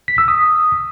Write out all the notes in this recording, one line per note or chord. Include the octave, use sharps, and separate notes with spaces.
B6
E6
D#6